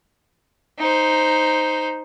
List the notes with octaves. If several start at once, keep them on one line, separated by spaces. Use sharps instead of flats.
D#4 C5